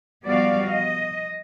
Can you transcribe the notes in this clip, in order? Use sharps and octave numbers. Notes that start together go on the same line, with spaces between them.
F3 G3 B3 F#4 D5 F5
D#5